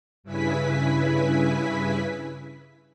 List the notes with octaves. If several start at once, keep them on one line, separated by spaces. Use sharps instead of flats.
G2 C#3 E4 B4 G#5 B6